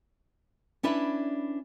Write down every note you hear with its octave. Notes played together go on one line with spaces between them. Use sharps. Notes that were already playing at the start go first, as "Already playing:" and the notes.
C#4 D4 E4 B4 D5 E5